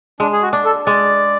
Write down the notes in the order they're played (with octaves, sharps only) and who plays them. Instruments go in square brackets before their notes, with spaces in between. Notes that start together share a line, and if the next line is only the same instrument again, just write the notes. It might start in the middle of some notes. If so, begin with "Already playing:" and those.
[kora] G#3 [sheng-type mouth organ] D4
[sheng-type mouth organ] G#4
F#4
[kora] D4
[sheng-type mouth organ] A4
[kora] G#3 [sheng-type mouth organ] D5